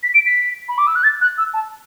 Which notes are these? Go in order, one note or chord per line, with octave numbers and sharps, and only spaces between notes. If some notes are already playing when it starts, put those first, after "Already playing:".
B6
D7
B6
B5
D6
E6
F#6
A6
F#6
E6
A5